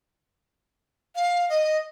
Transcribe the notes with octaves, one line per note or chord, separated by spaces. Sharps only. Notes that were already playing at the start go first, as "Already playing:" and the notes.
F5
D#5